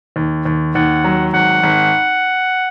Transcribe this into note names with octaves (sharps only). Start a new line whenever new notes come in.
D#2
D#2
D#2 F#5
F#3
G#1 F#5
G#1